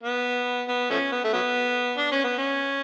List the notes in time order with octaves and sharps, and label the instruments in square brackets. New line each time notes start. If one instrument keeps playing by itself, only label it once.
[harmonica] B3
B3
F3 A3 C#4
B3
A3
F#3 B3
D4
C#4
B3
C#4